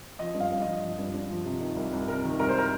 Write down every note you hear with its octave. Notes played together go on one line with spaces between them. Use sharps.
F3 D#5
G2
F5
G2
F3 D#5
F3
G2
G2
F3
C3
D#3
C2
C2
C3 A#4
D#3
C2 A#4
C5
A#4